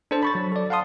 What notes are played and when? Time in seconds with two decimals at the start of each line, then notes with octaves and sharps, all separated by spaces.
0.11 D4 A4 C5 A5
0.23 B5 C#6 A6
0.35 F#3
0.52 A4 D5
0.70 F5 F#5 A5 C6 D#6